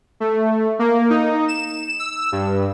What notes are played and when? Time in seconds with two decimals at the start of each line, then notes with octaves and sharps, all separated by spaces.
0.20 A3
0.79 A#3
1.10 D#4
1.48 E7
1.99 E6
2.32 G2